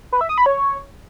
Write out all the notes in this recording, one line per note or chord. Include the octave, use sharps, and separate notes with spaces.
B4
E5
D#6
B5
C#5